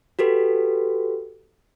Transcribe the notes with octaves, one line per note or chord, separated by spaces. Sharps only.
F#4 G4 A4 B4